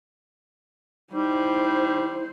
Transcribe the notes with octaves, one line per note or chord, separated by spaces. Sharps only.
G3 D#4 E4 C5